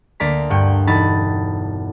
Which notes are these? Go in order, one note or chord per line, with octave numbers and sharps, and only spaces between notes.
D2 A#3 D5 A#5 B6
G2 F#5 G5 G6
E1 D#4 A4 B5 A6